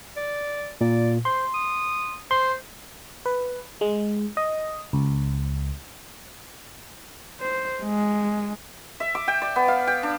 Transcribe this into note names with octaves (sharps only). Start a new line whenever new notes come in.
D5
A#2 D5
C5 C6
D#6
C5 C6
B4
G#3
D#5
C#2
C5
G#3
E5
D6
G5
D5
B3
F5
G5
D4